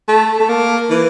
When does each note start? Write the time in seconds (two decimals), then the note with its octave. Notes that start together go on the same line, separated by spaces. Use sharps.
0.08 A3
0.40 A3
0.49 A#3
0.90 E3